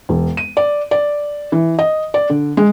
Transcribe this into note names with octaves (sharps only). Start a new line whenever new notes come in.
E1
D#7
D5
D5
E3
D#5
D5
D3
G#3